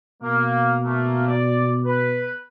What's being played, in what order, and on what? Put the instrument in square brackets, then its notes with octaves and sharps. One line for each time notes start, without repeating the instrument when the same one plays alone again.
[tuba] B2 [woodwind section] A#3
[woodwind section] A3 A#3
D5
B4